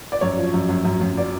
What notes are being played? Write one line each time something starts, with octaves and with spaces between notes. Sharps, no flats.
D5
F#2 C#5
F3
F#2
F#2
F#2
F#2
D5